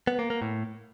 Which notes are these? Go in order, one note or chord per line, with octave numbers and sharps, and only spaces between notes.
B3
A#3
A#3
A2